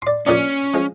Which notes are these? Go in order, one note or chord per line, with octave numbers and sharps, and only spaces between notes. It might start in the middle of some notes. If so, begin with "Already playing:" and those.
D5 C6
A#1 A#2 C#4 D5
F3 G#3